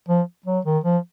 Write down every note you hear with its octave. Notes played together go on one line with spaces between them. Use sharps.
F3
F#3
D#3
F3